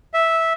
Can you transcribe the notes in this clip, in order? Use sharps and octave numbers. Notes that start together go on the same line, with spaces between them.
E5